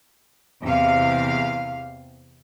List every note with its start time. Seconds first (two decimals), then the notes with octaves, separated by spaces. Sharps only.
0.63 E2 C3 F5